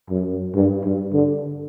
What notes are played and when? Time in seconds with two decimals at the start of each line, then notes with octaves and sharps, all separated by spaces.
0.10 F#2
0.55 G2
0.84 G2
1.13 D3